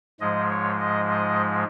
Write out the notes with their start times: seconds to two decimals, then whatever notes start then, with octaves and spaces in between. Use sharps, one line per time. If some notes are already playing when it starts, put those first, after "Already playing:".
0.21 G#2 F3 G#3 D#5
0.50 C#5
0.80 D#5
1.11 D#5